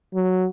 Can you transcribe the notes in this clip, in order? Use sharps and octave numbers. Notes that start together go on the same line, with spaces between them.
F#3